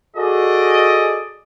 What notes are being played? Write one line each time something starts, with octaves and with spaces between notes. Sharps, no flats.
F#4 G#4 A4 D5 D#5